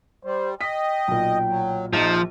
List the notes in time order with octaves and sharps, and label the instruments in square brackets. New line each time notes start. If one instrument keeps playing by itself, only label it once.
[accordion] G3 [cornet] C5
[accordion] D#5 [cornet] G5 [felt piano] B6
[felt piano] B1 A#2
[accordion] F#3
[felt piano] A#1 [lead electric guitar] F3 [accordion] D#4